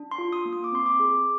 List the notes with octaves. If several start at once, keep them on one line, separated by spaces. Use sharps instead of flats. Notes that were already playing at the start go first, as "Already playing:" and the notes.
Already playing: D4
C6
F4
D#6
A#3
D#6
D6
C4 C6
D6
G#4